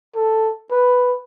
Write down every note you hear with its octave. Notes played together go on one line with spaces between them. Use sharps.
A4
B4